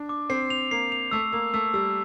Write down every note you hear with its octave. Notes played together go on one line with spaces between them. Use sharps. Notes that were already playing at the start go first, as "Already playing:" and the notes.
Already playing: D4
D6
C4 C7
F7
A#3 C7
F7
A3 E6
A#3 E6
A3 E6
G3 E6